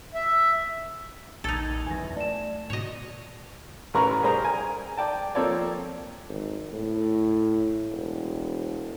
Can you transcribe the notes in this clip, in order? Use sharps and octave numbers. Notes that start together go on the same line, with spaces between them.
E5
A#1 D#2 D#4 A4 G#6
F#1 E2 G#5 A#6
A3 D5 A5 E7
G#2 B2 F#4 C#5 D#5
A1 C#4 A#4 B4 A#5 C#6
G3 G#4 A#4 C5 A#5
A#4 G#5
D5 G5 A5
F3 A#3 C4 A4 C#5 D5
G#1
A2
E1